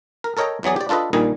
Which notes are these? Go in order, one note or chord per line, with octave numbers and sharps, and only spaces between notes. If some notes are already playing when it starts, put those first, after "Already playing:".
A#4
A4 A#4 C#5 D#5 G5 A#5
E2 E3 F#3 G#4 D5
G4 D5
D4 F4 A4 B4 D#5
A#1 A#2 D#3 G3 D#5 G#5